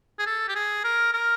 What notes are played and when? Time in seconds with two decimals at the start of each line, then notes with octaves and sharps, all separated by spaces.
0.19 G#4
0.26 A4
0.48 G4
0.55 G#4
0.84 A#4
1.13 A#4